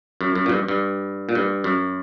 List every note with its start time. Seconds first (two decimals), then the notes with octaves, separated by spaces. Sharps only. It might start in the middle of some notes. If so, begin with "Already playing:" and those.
0.21 F#2
0.35 F#2
0.46 A#2
0.49 G2
0.68 G2
1.29 A#2
1.35 G2
1.64 F#2